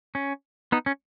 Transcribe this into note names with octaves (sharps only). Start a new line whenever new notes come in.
C#4
B3 D#4
C#4